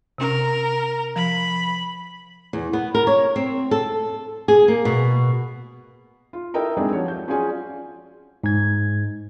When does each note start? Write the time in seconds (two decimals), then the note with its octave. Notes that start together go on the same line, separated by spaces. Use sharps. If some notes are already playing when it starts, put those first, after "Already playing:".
0.18 C3 C#4 A#4
1.16 F3 B5
2.53 E2
2.73 B3
2.94 A#4
3.07 C#5
3.36 C4
3.71 A4
4.48 G#4
4.68 A#3
4.85 B2
6.33 F4
6.54 E4 A4 A#4 D#5 G5 A#5
6.77 G#3 C4 D4 D#4 G4 G#4
6.93 F3 F#3 C#5
7.08 G6
7.28 C#4 F4 F#4 G#4 D5 G#5
8.44 G#2 G#6